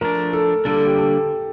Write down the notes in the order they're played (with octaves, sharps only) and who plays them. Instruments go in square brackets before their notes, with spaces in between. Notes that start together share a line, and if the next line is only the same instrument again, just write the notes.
[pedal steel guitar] F3 A3 D4 [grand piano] A#4
[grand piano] A4
[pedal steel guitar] D3 G3 A#3 D4 [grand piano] A4
[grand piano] A4
G4
A4